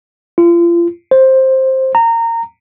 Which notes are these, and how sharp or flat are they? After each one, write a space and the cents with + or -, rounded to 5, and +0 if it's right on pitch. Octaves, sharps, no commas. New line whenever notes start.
F4 -35
C5 +10
A#5 -20